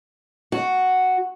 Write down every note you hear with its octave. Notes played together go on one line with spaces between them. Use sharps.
F#4